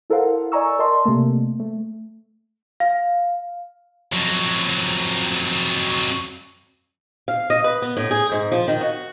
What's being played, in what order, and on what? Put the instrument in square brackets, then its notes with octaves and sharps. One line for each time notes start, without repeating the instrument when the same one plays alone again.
[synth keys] E4 A4 A#4 C5 F5 F#5
D5 D#5 G#5 A#5 C#6 E6
A#4 D5 D#5 A5 C6
C3 A3 A#3
A3
[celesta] F5
[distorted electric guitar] F2 F#3
[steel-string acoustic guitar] F5
D#5
B4
B3
A2
G#4
G#2
F3
D#3
F#4